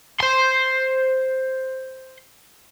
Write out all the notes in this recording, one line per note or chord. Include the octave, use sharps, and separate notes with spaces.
C5 C6